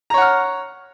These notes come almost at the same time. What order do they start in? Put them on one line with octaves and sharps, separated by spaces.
A#5 C#5 F#5 F6